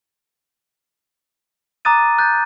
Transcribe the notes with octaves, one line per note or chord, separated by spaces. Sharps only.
A#5 D6 D#6 F#6 A6 D#7
F#6 G6 A6